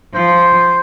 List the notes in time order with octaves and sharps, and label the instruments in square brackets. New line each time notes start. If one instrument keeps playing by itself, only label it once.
[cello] F3 [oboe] C5